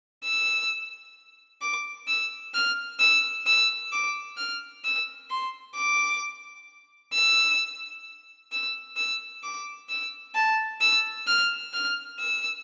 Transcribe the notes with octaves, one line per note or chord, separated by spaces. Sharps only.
E6
D6
E6
F6
E6
E6
D6
F6
E6
C6
D6
E6
E6
E6
D6
E6
A5
E6
F6
F6
E6